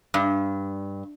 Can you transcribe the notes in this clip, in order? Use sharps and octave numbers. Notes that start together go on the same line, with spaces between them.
G2